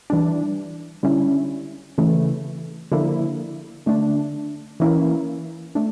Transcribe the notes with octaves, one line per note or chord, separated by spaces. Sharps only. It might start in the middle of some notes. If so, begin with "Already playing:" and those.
E3 G3 D4
D3 G3 C#4 E4
C#3 E3 A3
D3 F3 A#3 E4
D3 A3 D4
E3 A#3 C#4 E4
A3 D4